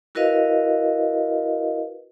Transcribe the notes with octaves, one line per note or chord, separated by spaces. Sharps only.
E4 F#4 A#4 B4 D#5 F5